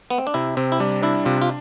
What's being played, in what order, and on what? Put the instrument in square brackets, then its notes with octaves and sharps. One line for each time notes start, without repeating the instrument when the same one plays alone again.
[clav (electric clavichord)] B3
C4
D4
[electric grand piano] C3 [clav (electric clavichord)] E4
[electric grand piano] C3 [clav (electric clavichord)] C4
[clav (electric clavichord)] E4
[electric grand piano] G3 [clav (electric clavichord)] D4
[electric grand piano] D4 [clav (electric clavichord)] E4
[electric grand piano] C3 [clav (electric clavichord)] F4
[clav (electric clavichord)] F4